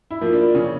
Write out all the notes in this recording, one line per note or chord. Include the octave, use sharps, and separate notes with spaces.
E4
F3 A#3
D4
C#3 C#4